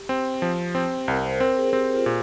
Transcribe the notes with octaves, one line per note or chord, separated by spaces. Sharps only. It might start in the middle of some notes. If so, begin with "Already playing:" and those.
Already playing: G4
C4
F3
C4
C2 A#4
C5
C4 A#4
G#4
C4 G4
F4
A#2